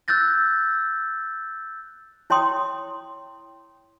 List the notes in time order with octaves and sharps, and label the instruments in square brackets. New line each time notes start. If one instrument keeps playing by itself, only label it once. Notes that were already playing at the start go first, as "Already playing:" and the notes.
[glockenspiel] E6 F#6 G6 A6 A#6
[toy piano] E4 C#5 G5 C6 D#6